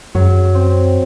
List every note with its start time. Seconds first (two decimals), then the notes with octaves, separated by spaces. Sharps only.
0.15 F#2 F#3
0.55 C4